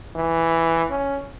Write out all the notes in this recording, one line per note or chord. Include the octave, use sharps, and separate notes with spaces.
E3
C#4